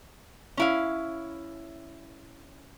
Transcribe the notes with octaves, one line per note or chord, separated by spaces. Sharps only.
C#4 E4 F5